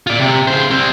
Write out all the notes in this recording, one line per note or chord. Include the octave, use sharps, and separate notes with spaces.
F4 D5
C3
C#3 C5
G3 C4